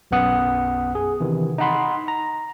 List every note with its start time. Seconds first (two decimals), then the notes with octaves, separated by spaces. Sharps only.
0.11 B1 F#2 B3 F#5 D#6
0.95 G#4
1.20 C3 D#3 E3
1.58 D#4 D#5 F#5 B5 C6
2.08 A#5